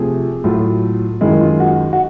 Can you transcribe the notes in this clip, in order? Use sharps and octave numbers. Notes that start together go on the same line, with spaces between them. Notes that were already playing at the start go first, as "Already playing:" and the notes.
Already playing: C3 F3 A3 G#4
A2 F#3 A3 F4
F#2 D#3 G#3 E4
F4
F#4
F#4